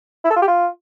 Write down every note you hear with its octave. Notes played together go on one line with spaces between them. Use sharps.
E4
A4
F4
G4
F4